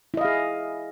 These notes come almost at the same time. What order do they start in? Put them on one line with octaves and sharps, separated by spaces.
E4 D#5 F5 G#4